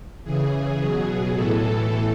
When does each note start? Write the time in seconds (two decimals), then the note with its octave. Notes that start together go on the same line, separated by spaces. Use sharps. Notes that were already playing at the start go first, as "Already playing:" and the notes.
0.24 C#3 E3 G#4
0.79 B2 F#3
1.34 A2 E3 A4